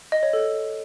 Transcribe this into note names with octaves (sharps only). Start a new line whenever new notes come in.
D#5
C#5
A4